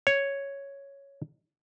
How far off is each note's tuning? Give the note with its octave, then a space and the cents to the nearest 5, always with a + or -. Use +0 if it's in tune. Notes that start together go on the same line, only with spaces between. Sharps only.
C#5 +0